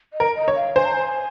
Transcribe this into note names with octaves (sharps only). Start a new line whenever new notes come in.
D#5
A#4
D#5
C#5
F5
C5 G#5
A#5
G#5